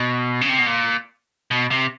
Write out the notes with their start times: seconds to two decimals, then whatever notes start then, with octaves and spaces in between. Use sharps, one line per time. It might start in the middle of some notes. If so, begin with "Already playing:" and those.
Already playing: B2
0.41 C#3
0.49 C3
0.58 B2
0.66 A#2
1.51 B2
1.71 C3